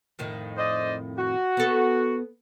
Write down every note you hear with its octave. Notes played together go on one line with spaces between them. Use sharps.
F2 A2 D#3
C5 D5 D#5
F#4
B3 A4